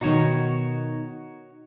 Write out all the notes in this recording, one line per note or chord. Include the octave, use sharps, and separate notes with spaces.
B2 D#3 D#4 F#4 C#5